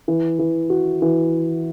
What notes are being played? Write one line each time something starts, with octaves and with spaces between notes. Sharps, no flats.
E3
E3
F#4
E3